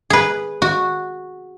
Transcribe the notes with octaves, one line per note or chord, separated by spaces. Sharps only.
G#4 B4
F#4